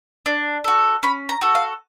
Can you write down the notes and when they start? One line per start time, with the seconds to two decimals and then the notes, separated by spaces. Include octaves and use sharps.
0.26 D4
0.64 F#4 A4
1.03 C#4 B5
1.29 A#5
1.41 F#4 A4
1.55 F5